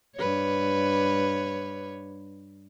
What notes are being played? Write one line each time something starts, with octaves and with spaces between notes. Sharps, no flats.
G2 B4 C#5